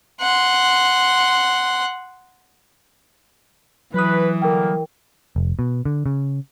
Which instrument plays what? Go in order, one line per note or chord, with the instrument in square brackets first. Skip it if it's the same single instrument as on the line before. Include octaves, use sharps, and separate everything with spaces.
[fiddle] F#5 C6
[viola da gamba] E3 [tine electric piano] F#3 D#6 [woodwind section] B4
[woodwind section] D3 G3 A#3 [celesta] A#4 G5
[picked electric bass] F1
B2
D3
C#3